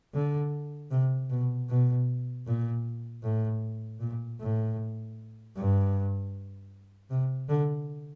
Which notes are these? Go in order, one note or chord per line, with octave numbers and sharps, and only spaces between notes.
D3
C3
B2
B2
A#2
A2
A#2
A2
G2
C3
D3